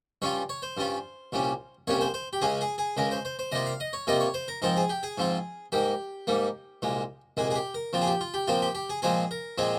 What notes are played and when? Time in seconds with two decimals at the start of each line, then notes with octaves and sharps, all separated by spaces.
0.22 G2 G3 C#4 F4 C#5
0.49 C#5
0.62 C5
0.77 G2 G3 C#4 F4
1.32 C2 A#2 G3 C#4
1.87 C2 A#2 G3 C#4 C#5
2.01 C5
2.14 C5
2.33 G4
2.41 C#2 C#3 G#3 C#4 G#4
2.61 G#4
2.78 G#4
2.97 C#2 C#3 G#3 C#4 A#4
3.11 C5
3.25 C5
3.39 C5
3.52 C3 G3 A#3 F4 D#5
3.66 F5
3.80 D#5
3.93 C#5
4.07 C3 G3 A#3 F4 D#5
4.20 C#5
4.34 C5
4.48 A#4
4.62 G#2 F3 C4 F4 A#4
4.77 G#4
4.89 G4
5.03 G#4
5.18 G#2 F3 C4 F4
5.72 G#2 G3 A#3 G4
6.27 G#2 G3 A#3
6.82 C2 A#2 G#3
7.37 C2 A#2 G#3 G#4
7.51 G#4
7.55 G4
7.74 A#4
7.93 A#2 F3 C4 F4
8.01 G#4
8.07 G4
8.21 F4
8.34 G4
8.47 A#2 F3 C4 F4
8.62 G4
8.75 G4
8.89 G#4
9.02 A#2 F3 G#3 C4 G#4
9.31 A#4
9.58 A#2 F3 G#3 C4 G#4